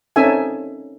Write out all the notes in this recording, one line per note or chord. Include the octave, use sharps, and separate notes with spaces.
C4 C#4 D#4 A4 E5 G#5